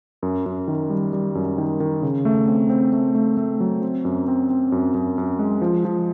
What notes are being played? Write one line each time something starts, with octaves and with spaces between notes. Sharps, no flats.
F#2
F#2
D#3
G3
G3
F#2
D#3
D#3
C#3
A3
C4
C4
A3
A3
A3
F#3
C4
F#2
C4
C4
F#2
F#2
F#2
G#3
F3
F3